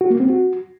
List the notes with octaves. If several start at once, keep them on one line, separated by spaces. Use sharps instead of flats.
F#4
A#3
C4
F#4